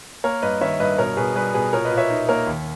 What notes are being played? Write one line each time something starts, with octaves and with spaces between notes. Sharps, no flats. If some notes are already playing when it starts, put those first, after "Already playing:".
A#3 A#4 C#5
G2 B4 D#5
D#3 C#5 E5
G2 B4 D#5
B2 A#4 C#5
B2 G#4 B4
G3 G#4 B4
B2 G#4 B4
A#2 A#4 C#5
B4 D#5
A#2
C#5 E5
D#4
A#3 A#4 C#5
D#2